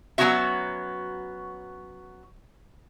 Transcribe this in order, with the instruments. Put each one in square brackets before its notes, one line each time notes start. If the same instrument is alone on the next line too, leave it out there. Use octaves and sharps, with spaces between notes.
[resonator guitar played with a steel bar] F#3 G#3 B3 C#4 F#4 E5